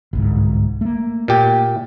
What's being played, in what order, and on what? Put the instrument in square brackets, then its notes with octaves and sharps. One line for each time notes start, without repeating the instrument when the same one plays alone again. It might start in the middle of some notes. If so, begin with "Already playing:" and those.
[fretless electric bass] G1 C2 G#2
A3 A#3
[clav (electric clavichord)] A#2 G4